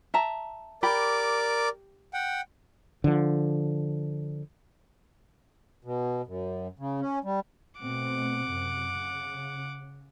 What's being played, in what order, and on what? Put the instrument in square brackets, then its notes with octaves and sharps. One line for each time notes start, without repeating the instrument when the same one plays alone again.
[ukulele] E5 A5 A#5
[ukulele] G4 B5 [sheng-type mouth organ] A#4 D5 D6
[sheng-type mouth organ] F#5 G5
[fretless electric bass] D3 F3
[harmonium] B2
F#2
C#3
C#4
G3
[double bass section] B2 A3 C4 [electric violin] F#5 D6
[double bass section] F#2 C3
C#3